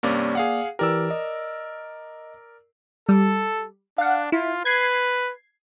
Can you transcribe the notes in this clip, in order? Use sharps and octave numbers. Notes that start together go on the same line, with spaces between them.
G2 C3 A#3 C#4 D5
G#4 F5 F#5
E3 G4 A#4 D5 E6
D#5
G3 A4
D4 F5 F#5
E4 F4
B4 G#6 C7